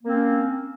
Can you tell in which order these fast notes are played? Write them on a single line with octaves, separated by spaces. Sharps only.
A#3 C4 C#4